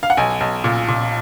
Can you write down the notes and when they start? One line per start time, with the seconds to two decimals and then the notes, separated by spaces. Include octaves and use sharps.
0.03 F5
0.10 F#5
0.17 B1 G#5
0.41 B1
0.64 A#2
0.88 A#2